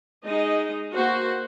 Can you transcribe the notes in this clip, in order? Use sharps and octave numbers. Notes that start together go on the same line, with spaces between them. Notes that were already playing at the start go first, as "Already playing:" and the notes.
G#3 D#4 D#5
A#3 F#4 C5